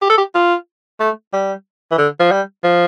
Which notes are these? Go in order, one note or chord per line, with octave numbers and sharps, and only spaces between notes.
G4
A4
G4
F4
A3
G3
E3
D3
F3
G3
F3